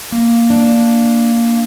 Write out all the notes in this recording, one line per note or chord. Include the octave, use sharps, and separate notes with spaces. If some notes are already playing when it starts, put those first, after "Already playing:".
A#3
D4